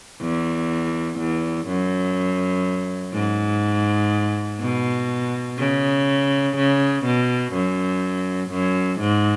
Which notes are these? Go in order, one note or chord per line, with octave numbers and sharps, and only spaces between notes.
E2
E2
F#2
G#2
B2
C#3
C#3
B2
F#2
F#2
G#2